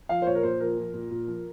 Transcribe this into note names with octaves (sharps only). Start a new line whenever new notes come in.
F3 F5
C5
A#2 C#5
A#4
A#2 C5
F3 A#4
F3
A#2
A#2
F3